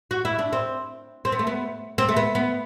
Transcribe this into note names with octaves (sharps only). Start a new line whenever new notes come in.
F#4
E4
D4
C4
C4
B3
A3
B3
C4
A3
B3
B3